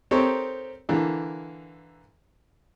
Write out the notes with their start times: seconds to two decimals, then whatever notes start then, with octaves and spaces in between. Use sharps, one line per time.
0.11 C4 D#4 G4 A4 A#4 C#5
0.89 D3 E3 A#3